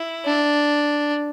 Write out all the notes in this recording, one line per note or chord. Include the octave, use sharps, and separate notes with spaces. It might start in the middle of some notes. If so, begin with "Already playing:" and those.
Already playing: E4
D4